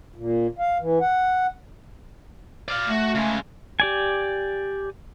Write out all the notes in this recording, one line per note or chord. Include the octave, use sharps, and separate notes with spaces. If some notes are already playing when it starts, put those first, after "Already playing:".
A#2
F5
E3
F#5
D5 F5
A3 F#4
C#3 G#3
G4 D5 G#5